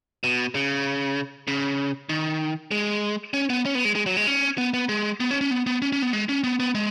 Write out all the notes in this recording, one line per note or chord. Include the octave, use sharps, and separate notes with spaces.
B2
C#3
C#3
D#3
G#3
C#4
B3
C#4
B3
G#3
G#3
F#3
G#3
C#4
B3
B3
G#3
B3
C#4
C#4
B3
B3
C#4
C#4
B3
G#3
C#4
B3
B3
G#3